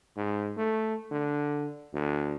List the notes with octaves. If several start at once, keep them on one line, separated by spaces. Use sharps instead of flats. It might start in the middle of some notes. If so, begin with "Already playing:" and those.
G#2
A3
D3
D2